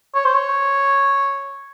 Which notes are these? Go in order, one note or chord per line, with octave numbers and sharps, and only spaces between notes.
C#5
C5
C#5